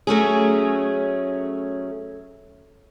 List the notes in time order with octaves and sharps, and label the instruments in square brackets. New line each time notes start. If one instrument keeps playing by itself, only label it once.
[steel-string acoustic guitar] F#3 A3 C#4 G#4